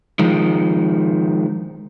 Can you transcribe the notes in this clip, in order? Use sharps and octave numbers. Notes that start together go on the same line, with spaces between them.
D#3 F3 G#3